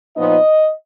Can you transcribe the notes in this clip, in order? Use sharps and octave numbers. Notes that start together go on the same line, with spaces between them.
A#2 F3 B3 D#4 D#5